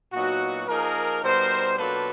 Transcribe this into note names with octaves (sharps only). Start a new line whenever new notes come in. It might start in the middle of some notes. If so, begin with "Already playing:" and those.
A#2 F#3 B3 D#4 F#4
F3 A#3 D#4 G#4 A#4
B2 G3 B3 D#4 A#4 C5
B2 F#3 A#3 D4 F4 A4 B4